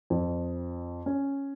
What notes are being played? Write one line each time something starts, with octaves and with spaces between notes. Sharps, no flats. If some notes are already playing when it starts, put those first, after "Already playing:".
F2
C#4